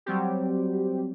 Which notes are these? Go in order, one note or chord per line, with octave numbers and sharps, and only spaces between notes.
F#3 G3 C4 G4